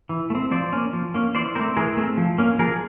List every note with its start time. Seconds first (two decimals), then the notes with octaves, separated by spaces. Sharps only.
0.09 E3
0.30 A3
0.35 C4
0.51 F3 C5 D5
0.73 A#3 C#4
0.93 F3
1.14 A#3 C#4
1.35 E3 C5 D5
1.55 C4 A#4 C5
1.59 A3
1.77 E3 G#4 A#4
1.97 A3 C4
2.17 F3
2.38 A#3 C#4
2.59 F3 G#4 A#4